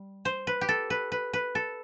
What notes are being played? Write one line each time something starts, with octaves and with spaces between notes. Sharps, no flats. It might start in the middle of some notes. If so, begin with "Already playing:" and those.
Already playing: G3
C5
B4
G4
A4
B4
B4
B4
A4